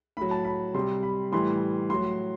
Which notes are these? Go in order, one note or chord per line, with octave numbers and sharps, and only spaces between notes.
A2 F#3 B5
A5
B5
C3 G3 C6
B5
A2 E3 G3 C6
A2 F#3 C6